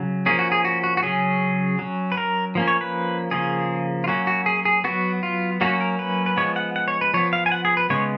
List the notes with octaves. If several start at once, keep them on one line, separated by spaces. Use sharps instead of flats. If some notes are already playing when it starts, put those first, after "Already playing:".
Already playing: C#3 F#3
F3 A#3 C#4 G#4
F#4
G#4
F#4
F#4
F#4
C#3 F#3 C#4 G#4
F#3 C#4
B4
A#4
F3 A#3 C#4
C#5
B4
C#3 F3 A#3 G#4
F4
F#3 A#3 C#4 F#4
F#4
G#4
G#4
F#3 B3 F#4
F4
F#3 A#3 C#4 F#4
A#4
B4
B4
F3 G#3 B3 C#5
F#5
F#5
C#5
B4
F3 B3 C#5
F5
G#5
F#5
G#4
B4
C#3 G#3 B3 C#5